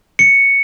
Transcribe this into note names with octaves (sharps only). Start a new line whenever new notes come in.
C#7